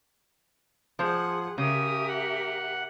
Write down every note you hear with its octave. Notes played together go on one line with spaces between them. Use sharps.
F3 G#4 C5 F#5
C#3 G4 A#4 E5 D#6
F#5